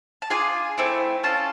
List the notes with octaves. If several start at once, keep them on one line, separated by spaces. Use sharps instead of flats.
A5
D4 F4 G#4 G#5
A3 C4 E4
C#4 F4 A4 A5